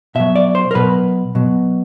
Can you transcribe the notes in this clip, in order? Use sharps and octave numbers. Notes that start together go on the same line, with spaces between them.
B2 F#3 E5
D5
C5
A#4
B2 F#3 B4
B2 F#3